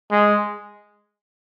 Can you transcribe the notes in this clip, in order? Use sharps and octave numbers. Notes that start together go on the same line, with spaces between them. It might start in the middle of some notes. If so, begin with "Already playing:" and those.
G#3